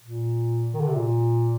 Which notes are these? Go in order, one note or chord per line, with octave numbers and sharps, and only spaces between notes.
A#2
D#3
D3
C3
A#2